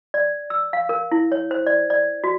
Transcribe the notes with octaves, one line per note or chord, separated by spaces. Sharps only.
D5
E6
F5
A#4
E4
C#5
C5
D5
D5
F#4